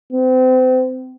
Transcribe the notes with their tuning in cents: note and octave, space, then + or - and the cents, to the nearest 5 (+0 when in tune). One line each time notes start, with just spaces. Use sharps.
C4 -35